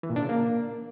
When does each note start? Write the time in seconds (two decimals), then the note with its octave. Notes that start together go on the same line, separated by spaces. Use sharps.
0.03 E3
0.10 A#2
0.16 D4
0.23 C#3
0.29 A#3